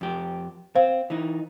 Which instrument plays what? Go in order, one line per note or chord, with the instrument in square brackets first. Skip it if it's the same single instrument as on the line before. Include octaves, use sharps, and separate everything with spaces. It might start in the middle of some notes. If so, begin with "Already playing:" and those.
[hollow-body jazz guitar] F2 G4
[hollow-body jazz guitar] C4 [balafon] C5 F5
[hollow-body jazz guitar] E3 D#4